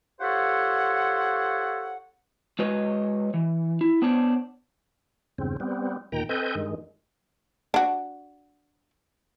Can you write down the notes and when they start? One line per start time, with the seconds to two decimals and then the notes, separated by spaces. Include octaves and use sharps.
0.21 F4 G4 A4 C5 C#5 F#5
2.59 G#3 F#4 B4 C#5 D#5
3.34 E3
3.81 E4
4.02 B3 D4 C5 C#5
5.38 E2 G2 C#3 C4
5.60 G3 B3 C4
6.12 D#2 A#2 D#3 G5 A#5
6.29 C4 A4 B4 D#5 G#5 G6
6.55 G2 D#3 G#3
7.74 D4 F#4